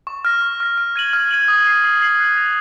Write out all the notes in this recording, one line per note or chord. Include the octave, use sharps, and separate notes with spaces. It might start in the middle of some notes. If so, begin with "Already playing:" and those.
C#6
F6 A#6
C#6
F6 A#6
F6
G#6 D#7 F#7
F6
G#6 D#7 F#7
D#6
G#6 C7 F#7
D#6
G#6 C7 F#7
F#6
A#6 F7